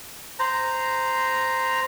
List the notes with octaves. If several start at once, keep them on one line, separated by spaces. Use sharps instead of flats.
C5 A#5